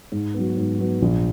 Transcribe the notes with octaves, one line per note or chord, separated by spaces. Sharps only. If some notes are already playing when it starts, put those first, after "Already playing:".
G#2
F#3 B3
G#2
F#3 B3
A#1